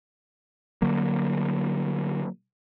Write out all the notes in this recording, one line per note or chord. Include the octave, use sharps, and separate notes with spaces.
D3 F#3 A#3